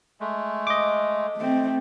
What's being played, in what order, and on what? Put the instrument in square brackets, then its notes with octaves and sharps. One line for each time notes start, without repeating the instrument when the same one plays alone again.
[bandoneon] G#3 A3
[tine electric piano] D#5 D6
[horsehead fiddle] A3 C4